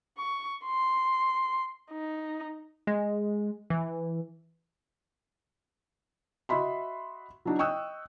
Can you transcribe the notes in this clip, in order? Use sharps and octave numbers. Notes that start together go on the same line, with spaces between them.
C#6
C6
D#4
G#3
E3
F#4 D#5 E5 B5 C6
F#3 D4 D#4
D#5 G5 C#6 D#6 E6 F#6